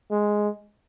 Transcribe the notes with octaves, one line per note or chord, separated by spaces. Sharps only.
G#3